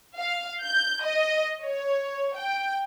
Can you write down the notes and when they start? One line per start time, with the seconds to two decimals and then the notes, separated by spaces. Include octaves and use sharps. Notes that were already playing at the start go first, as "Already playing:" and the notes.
0.18 F5
0.63 G6
1.04 D#5
1.64 C#5
2.38 G5